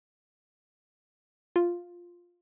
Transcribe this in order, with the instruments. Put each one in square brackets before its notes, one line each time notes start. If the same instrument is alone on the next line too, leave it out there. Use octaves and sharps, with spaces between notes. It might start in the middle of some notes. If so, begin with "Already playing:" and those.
[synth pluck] F4